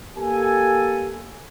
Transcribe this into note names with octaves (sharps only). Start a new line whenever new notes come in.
A#3 G4 A4 G#5